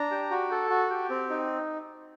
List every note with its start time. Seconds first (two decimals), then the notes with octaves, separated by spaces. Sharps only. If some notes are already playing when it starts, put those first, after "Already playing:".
Already playing: D4 A#5
0.11 G4
0.31 F#4
0.51 A4
0.70 F#4
0.90 G4
1.10 C4
1.30 D#4